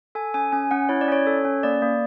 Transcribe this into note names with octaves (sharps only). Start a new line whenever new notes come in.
A4 G#5
C#4 G#5
C#4 G#5
C#4 F#5
E4 C#5
D5
C#4 C#5
A4
C#4
A#3 D5
A#3